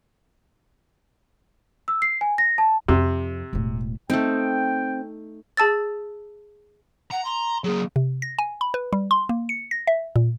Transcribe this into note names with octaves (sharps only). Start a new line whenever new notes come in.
E6
C7
G#5
A#6
A5
F2 C3
E1 A2
A3 C4 D#4 G5
G#4 A5 E6 A6
F#5 A#5
C6
F#3 A#3 G#4
C3
A#6
G#5
B5
B4
G3
C6
A#3
C#7
A#6
E5
A#2